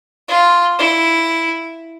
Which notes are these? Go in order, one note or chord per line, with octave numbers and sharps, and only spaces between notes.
F4
E4